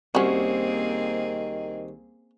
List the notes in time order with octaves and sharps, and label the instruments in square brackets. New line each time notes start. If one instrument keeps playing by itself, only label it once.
[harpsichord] C2 [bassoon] D#3 [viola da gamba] A#3 C4 G#4 [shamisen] C#4 F#4